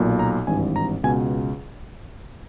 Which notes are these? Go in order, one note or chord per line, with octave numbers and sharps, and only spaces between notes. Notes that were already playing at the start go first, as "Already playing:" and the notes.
Already playing: B1 A#2
A#5
G#1 G2 E3 G#5
A#5
C#2 B2 G#5